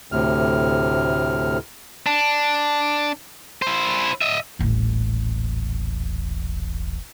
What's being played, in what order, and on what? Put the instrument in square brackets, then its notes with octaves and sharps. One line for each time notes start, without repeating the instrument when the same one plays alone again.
[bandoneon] D2 A2 C3 F6
[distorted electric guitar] D4
E4 C5
D#5 E5
[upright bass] D#1 A1